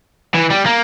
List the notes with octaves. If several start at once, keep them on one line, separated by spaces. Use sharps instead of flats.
E3
G3
A#3